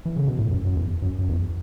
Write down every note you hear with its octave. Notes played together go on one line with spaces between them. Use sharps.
E3
C#3
B2
A2
F#2
F#2
E2
F#2
F#2
E2